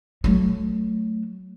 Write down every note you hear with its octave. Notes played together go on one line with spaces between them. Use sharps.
F#3 A3